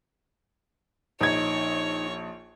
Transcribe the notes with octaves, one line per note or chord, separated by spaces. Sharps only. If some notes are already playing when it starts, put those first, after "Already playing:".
A#1 D#4 C#5 G#6